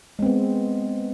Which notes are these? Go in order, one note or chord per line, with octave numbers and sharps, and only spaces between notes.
G#3 B3 C4